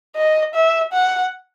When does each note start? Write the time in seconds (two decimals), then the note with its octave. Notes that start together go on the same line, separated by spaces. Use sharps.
0.16 D#5
0.54 E5
0.93 F#5